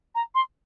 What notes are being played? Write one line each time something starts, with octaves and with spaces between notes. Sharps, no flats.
A#5
C6